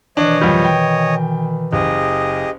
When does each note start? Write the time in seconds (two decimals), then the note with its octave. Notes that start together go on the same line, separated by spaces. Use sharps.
0.17 B2 D#3 E3 D4 C#5 D#5
0.41 F2 G3
0.64 G5
1.73 F#1 G4 G#4 D#5